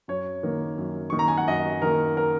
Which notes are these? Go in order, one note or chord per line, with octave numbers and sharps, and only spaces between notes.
F#2 C#5
D#3 A#3
F#2
D#3 A#3 C#6
A#5
G#5
F#5
F#2 D#5
D#3 A#3 A#4
A#4